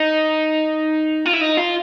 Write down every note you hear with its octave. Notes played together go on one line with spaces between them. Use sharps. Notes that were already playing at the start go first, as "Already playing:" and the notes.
Already playing: D#4
F4
E4
D#4
F4